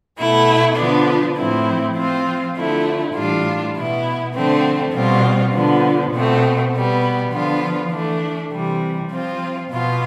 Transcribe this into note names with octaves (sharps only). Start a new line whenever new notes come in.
B2 A3 E4
D3 F3 B3 D4
A2 F3 C4 E4
F3 C4 F4
D3 F3 A3 E4
A2 E3 G3 D4 F4
B2 B3 E4
D3 F3 A3 C4
B2 G3 C4 F4
D3 F3 B3
B2 A3 C4
B2 G3 B3
D3 F3 B3 F4
E3 A3 D4
C3 E3 G3
F3 C4 F4
B2 B3 F4